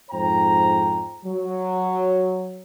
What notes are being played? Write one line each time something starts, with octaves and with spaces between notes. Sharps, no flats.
F2 G#2 C5 G5 A#5
F#3